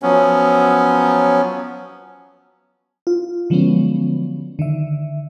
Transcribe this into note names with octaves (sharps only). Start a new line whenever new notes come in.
F3 F#3 B3 C#4
F4
D3 F3 F#3 G#3 B3 C#4
D3 D#3 E5